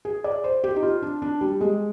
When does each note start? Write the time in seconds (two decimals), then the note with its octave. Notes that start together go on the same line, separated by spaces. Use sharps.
0.05 G#4
0.24 D5
0.44 C5
0.64 G4
0.76 D#4
0.83 F4
1.02 D4
1.22 D4
1.41 G3
1.61 G#3